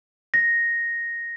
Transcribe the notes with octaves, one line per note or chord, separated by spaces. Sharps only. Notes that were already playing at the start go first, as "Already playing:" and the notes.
A#6